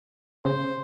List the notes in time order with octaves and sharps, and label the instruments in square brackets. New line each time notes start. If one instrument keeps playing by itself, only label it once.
[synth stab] C#3 [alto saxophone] C5